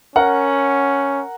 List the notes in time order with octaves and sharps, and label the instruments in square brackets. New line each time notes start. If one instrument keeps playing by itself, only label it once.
[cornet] C#4 [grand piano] A#4 F#5